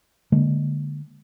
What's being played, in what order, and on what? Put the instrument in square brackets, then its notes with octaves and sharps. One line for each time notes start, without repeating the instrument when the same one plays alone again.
[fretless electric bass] D3 G#3 A#3